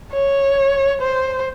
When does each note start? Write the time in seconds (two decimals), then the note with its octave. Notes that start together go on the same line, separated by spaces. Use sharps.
0.12 C#5
1.01 C5